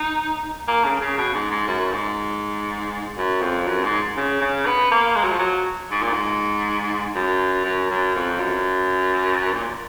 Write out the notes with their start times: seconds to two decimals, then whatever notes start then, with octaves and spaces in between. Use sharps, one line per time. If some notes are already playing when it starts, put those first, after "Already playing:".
Already playing: D#4
0.68 A#3
0.85 C#3
1.01 C#3
1.18 B2
1.34 G#2
1.51 G#2
1.67 F#2
1.93 G#2
3.18 F#2
3.42 F2
3.67 F#2
3.84 G#2
4.17 C#3
4.41 C#3
4.66 B3
4.91 A#3
5.16 G#3
5.23 F#3
5.31 F3
5.39 F#3
5.91 G#2
6.02 A#2
6.13 G#2
7.15 F#2
7.65 F#2
7.90 F#2
8.15 F2
8.39 F#2
9.53 A#2